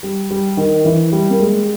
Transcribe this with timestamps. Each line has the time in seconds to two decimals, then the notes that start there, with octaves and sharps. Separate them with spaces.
0.03 G3
0.31 G3
0.57 D#3
0.85 E3
1.12 G3
1.30 A#3
1.39 G#3